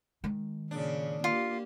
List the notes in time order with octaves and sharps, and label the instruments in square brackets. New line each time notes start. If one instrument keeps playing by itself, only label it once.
[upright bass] D#3 G#3
[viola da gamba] A#2 C#3 [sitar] D4
[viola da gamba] A#3 G4 [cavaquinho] F4